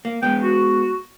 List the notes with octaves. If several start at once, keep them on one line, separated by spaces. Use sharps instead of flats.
A#3
G#3 B3 G5
F#4